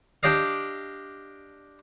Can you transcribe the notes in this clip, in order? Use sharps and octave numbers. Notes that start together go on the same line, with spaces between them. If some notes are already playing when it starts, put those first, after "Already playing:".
D4 G4 D5 D#5 F5